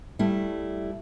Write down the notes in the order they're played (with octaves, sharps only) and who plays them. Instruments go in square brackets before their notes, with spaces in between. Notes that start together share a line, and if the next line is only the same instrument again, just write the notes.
[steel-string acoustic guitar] G3 A3 E4